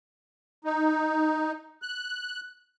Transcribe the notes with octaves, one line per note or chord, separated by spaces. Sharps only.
D#4
F#6